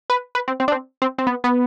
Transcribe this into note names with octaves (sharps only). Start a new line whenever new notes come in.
B4
B4
C4
C4
D4
C4
C4
C4
B3
B3